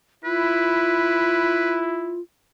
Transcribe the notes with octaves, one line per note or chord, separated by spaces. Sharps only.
E4 F4 B4